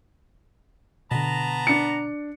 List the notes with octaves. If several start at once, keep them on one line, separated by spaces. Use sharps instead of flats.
B2 D3 B3 A5 A#5
D4 C#7